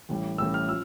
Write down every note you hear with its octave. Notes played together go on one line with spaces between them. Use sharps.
A1 A2 G3
A1 A2 G3 E6
F6
F3 E6